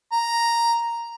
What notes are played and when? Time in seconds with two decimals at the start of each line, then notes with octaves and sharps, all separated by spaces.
0.12 A#5